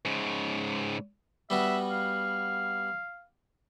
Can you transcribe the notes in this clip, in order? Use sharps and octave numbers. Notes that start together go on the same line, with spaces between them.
G#2 C#3
G3 B3 F#4 E5
F5